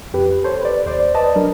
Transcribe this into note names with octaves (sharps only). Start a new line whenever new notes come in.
F2 G4 B4
A4 C5 C#5
B4 D5
D#2 C5 D5
B4 D5 D#5 A5
F#3 D4 A#4